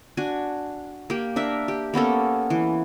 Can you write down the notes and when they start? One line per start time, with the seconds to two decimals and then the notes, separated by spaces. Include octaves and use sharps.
0.17 D4 F#4 G#5
1.10 A#3 G4
1.36 D4 A#4 E5
1.68 G4
1.94 A#3 B3 C#4 A4
2.50 E3